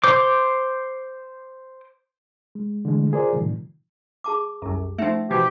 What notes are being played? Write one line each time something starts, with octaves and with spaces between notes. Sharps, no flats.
C5 D6
G#3
D3 E3 G#3 A3
F4 G#4 A#4 C5 D5
A2 C3 D#3 F3 G3
G#4 A5 D6
C2 F#2
F3 A3 C#4 D#4 E5
B2 E3 F3 G4